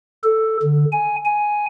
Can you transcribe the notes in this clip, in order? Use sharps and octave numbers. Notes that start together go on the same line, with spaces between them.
A4
D3
G#5
G#5